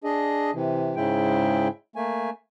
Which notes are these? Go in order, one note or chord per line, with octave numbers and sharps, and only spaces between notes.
D4 G#4 D#5
C3 E3
G#2 C#3 G#3 E4 G5
A3 A#3 G#5